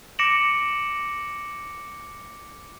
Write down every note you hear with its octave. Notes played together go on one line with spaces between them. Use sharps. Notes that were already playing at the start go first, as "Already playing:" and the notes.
D6 A#6 C#7 D7 E7 F#7